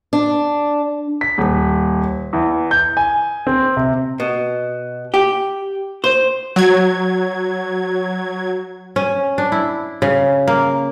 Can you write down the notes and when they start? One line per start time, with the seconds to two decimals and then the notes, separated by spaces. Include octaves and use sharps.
0.13 D4
1.21 B6
1.38 D#1
2.33 E2
2.71 G6
2.97 G#5
3.47 C4
3.77 C3
4.20 B2
5.14 G4
6.04 C5
6.56 F#3 G#6
8.96 C#4
9.38 D4
9.52 E4
10.02 C#3
10.48 A#3